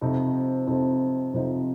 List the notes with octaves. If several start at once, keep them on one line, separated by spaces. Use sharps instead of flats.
F2 C3 F3 C4 D#4
F2 C3 F3 C4 D#4
F2 C3 F3 C4 D#4